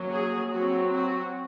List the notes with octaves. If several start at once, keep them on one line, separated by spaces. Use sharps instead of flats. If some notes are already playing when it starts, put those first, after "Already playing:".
Already playing: F#3 A#3 C#4
G#4
F#3 C4 F#4
F#4